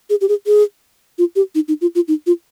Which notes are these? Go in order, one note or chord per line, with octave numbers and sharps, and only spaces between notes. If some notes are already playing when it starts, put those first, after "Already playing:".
G#4
G4
G#4
G#4
F4
G4
D#4
D#4
F4
F4
D#4
F4